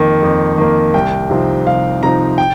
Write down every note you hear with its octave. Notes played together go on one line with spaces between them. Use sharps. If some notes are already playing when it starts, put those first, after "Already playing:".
Already playing: F2 D#3 A#3
F2
D#3 A#3
C2 G5
C3 F3 C4 D#4
C2 F5
C3 F3 C4 D#4 A#5
G5